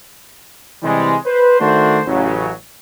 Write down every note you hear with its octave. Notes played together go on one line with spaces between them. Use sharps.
C3 E3 G3 G#3
B4 C5
D#3 A3 D4 F#4 C5
A1 C#3 F#3